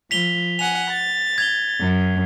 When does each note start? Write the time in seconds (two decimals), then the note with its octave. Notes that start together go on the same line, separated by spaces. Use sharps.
0.11 F3 B6 F7 G7
0.59 F#5 G#5 F7
0.90 A6
1.38 G#6 F7 G7
1.80 F#2